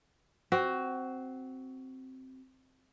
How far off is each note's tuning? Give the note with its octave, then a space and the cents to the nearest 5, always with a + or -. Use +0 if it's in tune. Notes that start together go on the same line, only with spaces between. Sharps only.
C4 +0 F#4 +15